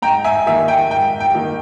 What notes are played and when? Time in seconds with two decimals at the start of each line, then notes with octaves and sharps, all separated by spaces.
0.02 G#2 G5 A#5
0.24 E5 G#5
0.46 D#3 A#3 E5
0.68 G5
0.90 G#2 G5
1.20 G5
1.34 D#3 A#3